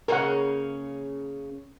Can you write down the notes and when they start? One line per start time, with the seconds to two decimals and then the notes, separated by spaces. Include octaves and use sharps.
0.08 C#3 A#3 C#4 A#4 F#5